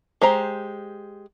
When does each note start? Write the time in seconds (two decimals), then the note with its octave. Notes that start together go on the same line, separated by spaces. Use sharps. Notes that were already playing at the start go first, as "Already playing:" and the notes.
0.22 G#3 G4 C5 A#5